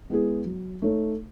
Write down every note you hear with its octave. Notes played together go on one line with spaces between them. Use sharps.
G#3 B3 E4 G#4
F#3
A3 D#4 A4 C#5